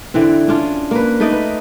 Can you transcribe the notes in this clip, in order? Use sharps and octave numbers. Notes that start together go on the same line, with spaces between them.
D3 E3 C4
C#4 D4 F4
A#3 B4
A3 D#4 D5 D#5
B4